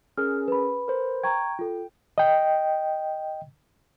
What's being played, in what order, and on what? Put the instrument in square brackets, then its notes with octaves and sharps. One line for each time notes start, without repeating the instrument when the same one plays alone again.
[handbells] C#4 G#4 A#4 [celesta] F6
[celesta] B4 B5
[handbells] A#4 C5
[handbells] G5 [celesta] A#5 C#6 G#6
[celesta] F4 A4
[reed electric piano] D#5 G5